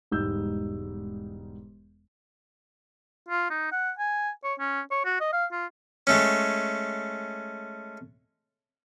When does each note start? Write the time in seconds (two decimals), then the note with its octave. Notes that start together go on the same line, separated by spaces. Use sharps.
0.11 E1 G#2 G3 D#4 E6 G6
3.29 F4
3.51 D#4
3.72 F#5
3.98 G#5
4.44 C#5
4.60 C#4
4.92 C#5
5.05 F#4
5.21 D#5
5.33 F5
5.52 F4
6.07 G#3 A3 C#4